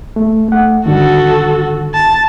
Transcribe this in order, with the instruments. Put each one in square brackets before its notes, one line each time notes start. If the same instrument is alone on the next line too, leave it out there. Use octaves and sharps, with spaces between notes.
[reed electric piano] A3
A3 F#5
[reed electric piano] G2 D3 D#3 [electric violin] F#4 A4
[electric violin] A5